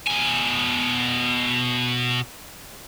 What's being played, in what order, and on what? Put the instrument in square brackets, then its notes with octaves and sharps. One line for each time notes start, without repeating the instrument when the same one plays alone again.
[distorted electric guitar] B2 G#5